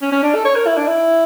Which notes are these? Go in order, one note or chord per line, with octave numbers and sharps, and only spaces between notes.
C#4
C#4
D4
A4
C#5
A#4
E4
D4
E4